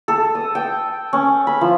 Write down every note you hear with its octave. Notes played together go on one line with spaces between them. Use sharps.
A4
D#6
G5
C#4
B5
F3